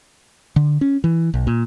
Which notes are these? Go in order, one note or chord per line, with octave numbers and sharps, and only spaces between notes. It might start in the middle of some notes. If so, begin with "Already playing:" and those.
D3
C#4
E3
B1
A#2